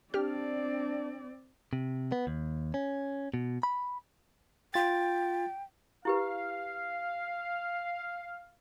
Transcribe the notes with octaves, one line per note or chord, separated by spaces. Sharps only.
C4 D4 G4 D5 F6
C3
B3
D#2
C#4
B2
B5
F4 G5 A6
E4 G4 B4 F5